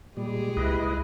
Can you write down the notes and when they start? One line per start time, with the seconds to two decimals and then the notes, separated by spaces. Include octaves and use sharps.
0.17 A#2 G3 G#3 G4 G#4
0.57 C#2 E4 B4 D#5